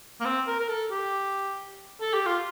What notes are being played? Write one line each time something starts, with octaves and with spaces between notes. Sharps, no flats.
A#3
C4
A#4
A#4
A4
G4
A4
G4
F4